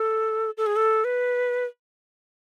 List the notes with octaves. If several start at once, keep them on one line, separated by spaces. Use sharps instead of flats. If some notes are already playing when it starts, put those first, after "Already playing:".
Already playing: A4
A4
G#4
A4
B4